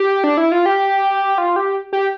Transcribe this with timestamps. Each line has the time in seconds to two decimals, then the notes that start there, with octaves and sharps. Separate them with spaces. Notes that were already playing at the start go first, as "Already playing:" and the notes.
Already playing: G4
0.24 D4
0.37 E4
0.52 F4
0.66 G4
1.38 F4
1.56 G4
1.93 G4